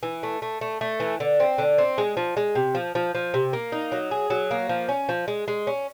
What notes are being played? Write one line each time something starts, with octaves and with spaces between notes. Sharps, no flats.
E3
A3
A3
A3
A3
E3
D3
C4
D3
C4
G#3
F3
G#3
C3
F3
F3
F3
C3
A#3
D#4
F#3
G#4
F#3
A#3
F3
C#4
F3
G#3
G#3
C#4